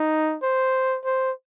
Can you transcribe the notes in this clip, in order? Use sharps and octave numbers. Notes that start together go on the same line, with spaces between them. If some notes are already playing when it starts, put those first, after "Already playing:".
Already playing: D#4
C5
C5